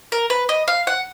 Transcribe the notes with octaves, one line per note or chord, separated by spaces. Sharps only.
A#4
B4
D#5
F5
F#5